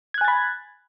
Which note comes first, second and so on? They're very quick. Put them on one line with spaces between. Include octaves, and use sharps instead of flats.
G#6 F#6 G#5 A6 B5